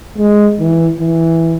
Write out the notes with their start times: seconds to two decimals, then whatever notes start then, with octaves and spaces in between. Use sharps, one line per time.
0.18 G#3
0.59 E3
1.00 E3